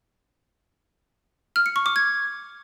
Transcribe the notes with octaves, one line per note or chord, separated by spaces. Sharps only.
F6
C#7
C#6
D6
G#6